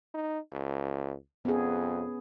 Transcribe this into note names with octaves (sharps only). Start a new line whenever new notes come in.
D#4
C#2
F2 B3 C#4 G#4